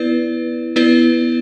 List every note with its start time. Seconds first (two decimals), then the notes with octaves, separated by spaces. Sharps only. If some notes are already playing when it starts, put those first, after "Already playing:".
Already playing: B3 E4 B4 D5
0.76 B3 E4 B4 D5